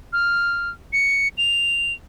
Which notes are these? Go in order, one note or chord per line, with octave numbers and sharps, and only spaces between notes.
F6
C#7
F7